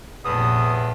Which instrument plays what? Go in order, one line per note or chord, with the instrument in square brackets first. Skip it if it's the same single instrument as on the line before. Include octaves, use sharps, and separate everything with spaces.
[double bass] F1 A#1 [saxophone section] E2 A2 B3 [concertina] D#6